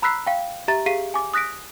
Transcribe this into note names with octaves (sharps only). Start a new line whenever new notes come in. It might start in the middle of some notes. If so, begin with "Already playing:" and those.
A#5 B5 E6 F#6 B6 C7
F5 G5
G4 E5 A#5 A6
G4 G#4 F5 B6 C7 D#7
G#5 D6
D#6 F#6 A#6 B6 D7